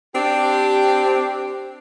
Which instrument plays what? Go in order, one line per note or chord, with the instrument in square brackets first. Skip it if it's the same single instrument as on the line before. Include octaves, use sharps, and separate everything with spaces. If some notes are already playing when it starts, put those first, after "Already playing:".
[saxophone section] C4 D4 G4